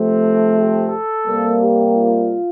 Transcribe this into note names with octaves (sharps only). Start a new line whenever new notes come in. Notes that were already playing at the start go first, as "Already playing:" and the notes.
Already playing: C3 F3 A3 C4
G4
A4
C3 G3 A#3
G4
F4